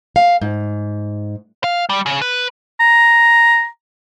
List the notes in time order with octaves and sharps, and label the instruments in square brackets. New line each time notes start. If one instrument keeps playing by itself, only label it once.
[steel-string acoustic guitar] F5
G#2
[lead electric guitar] F5
G3
C#3
B4
[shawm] A#5